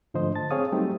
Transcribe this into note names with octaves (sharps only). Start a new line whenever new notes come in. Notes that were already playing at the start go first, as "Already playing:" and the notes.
G#2 D3 F3 A3 C5 D#5
A5 A6
C4 G#4 C#5 F5 D#6
F#3 G3 A3 C4 D#4 G4